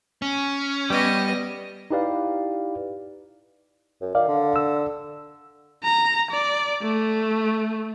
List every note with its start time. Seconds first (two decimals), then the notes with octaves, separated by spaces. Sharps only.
0.22 C#4
0.90 G3 B3 D#5
1.91 D#4 E4 G4 B4 D5 F5
4.01 F#2
4.15 D#3 D5 F5
4.28 D3
4.56 E6
5.84 A#5
6.31 D5
6.82 A3